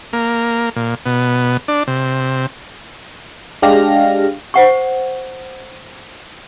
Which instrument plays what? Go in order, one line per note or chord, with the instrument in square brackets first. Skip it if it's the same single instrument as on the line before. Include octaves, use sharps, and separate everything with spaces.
[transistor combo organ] A#3
A#2
B2
D4
C3
[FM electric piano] G#3 D4 G4 F5 F6 A#6
[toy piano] C5 F#5 C#6